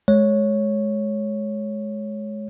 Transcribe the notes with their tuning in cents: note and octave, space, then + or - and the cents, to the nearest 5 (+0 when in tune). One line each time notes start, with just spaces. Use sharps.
G#3 +25 C#5 +0